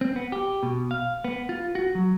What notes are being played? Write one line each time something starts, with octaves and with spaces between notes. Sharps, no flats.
C4
B3
G4
B2
F5
B3
F4
F#4
F#3